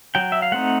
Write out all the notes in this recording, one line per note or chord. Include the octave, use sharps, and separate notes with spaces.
F#3 G5
E5
F5
A3 C4 D#4 F#5